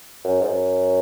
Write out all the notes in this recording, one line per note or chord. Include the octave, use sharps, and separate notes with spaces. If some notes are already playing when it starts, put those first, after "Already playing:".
F#2
G#2
F#2